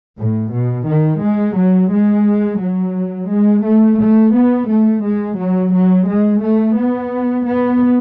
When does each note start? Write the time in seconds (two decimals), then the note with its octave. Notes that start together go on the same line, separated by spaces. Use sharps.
0.18 A2
0.53 B2
0.87 D#3
1.22 G#3
1.57 F#3
1.92 G#3
2.61 F#3
3.30 G#3
3.65 A3
4.00 A3
4.35 B3
4.69 A3
5.04 G#3
5.39 F#3
5.73 F#3
6.08 G#3
6.43 A3
6.78 B3
7.47 B3